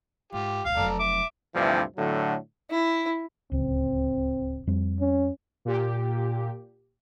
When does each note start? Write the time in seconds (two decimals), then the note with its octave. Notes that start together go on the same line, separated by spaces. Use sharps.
0.32 G#2 F4 G4
0.65 D#1 C#2 F5
0.77 F1 F#3 A4 D5 A#5
0.99 E5 D6
1.54 D2 G2 C3 E3 F3
1.97 A2 D3 F#3
2.70 E4
3.52 D1 C#2 C4
4.67 F2 G3 C4
5.00 C#4
5.65 A#2 G4